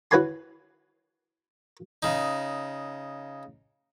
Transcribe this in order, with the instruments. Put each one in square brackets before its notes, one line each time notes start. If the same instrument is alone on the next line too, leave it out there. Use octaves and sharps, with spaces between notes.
[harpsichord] E4 F#4 B4 C#5 G#5 C6
C#3 D#4